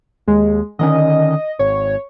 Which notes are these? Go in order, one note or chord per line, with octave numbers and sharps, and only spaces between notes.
D#2 G#3
D3 D#3 C#4 D#5
G#1 C#5